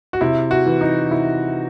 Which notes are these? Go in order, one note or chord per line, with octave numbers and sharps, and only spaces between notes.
F#4
C3 E4
F#4
E3
D#4
C3 E4